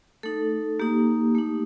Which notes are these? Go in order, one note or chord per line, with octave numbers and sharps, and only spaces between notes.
A3 D#4 A4
A#3 D#4 G4
A3 D#4